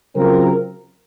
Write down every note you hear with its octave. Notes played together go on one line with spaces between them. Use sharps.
C#3 F#3 C4 F4 A#4